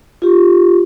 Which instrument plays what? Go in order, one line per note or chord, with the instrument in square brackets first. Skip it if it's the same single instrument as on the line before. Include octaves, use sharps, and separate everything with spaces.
[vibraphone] F4 G4